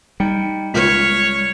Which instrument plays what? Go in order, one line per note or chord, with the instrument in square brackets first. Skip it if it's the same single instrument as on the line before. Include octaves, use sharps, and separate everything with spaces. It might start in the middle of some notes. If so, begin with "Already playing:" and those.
[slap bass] G3 [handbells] D#4 G5 C#7
[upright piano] C#2 [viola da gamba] C#5 [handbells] F6 B6